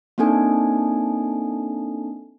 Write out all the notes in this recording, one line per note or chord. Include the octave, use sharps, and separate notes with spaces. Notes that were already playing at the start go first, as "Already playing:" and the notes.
A#3 C4 D4 D#4 A4 G#5